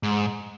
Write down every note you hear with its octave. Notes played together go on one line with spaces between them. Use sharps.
G#2